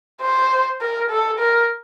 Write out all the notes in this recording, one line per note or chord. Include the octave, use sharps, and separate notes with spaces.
C5
A#4
A4
A#4